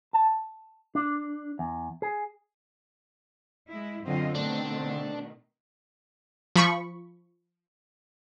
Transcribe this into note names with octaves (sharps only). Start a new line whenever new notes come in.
A5
D4
E2
G#4
G#3 E4
F#2 D3 C4 F4 D#5
B2 D#3 A3 D4
F3 B5 C#6